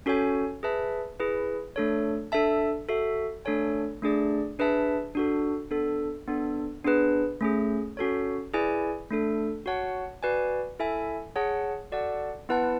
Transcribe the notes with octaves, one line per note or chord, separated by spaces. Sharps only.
C#4 F#4 A4 C#5 G#5
G#4 B4 E5 A5
E4 G#4 B4
A3 D4 A4 C#5
D4 A4 E5 A5
F#4 A4 E5
A3 D4 A4 C#5 G#5
A3 D4 G#4 D5
D4 G#4 B4 E5 A5
D4 F#4 A4
B3 D4 A4
B3 D4 A4
B3 D4 G#4 B4
A3 C#4 G#4
C#4 F#4 A4 C#5
E4 G#4 B4 D5 G#5
A3 D4 A4
F#4 C#5 F#5 A5
F#4 B4 D5 G#5
E4 A4 E5 G#5
G#4 C#5 F#5 A5
F#4 A4 D5 F#5 A5
B3 E4 B4 F#5 A5